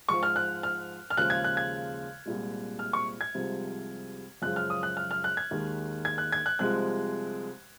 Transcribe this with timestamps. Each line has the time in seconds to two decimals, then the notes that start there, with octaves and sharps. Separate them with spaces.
0.08 G#2 F3 G#3 C#6
0.23 F6
0.36 F#6
0.63 F6
1.10 F6
1.17 D#2 C#3 F3 G#3 F#6
1.30 G#6
1.44 F#6
1.57 G#6
2.26 C2 A#2 G#3
2.79 F6
2.93 C#6
3.21 G#6
3.35 C2 C3 F3 G#3
4.42 F#2 C#3 F3 G#3 F#6
4.56 F6
4.70 D#6
4.83 F#6
4.97 F6
5.11 F6
5.24 F#6
5.37 G#6
5.51 D#2 D#3 G#3
6.05 G#6
6.18 F#6
6.32 G#6
6.46 F#6
6.59 C2 C3 F3 G#3 F#6